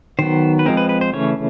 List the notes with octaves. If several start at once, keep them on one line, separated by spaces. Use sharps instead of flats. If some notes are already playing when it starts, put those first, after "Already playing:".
D#3 F#3 B3 C5
B4
F3 G#3 C4 A#4
B4
B4
C5
C#3 E3 A3 C#4 C#5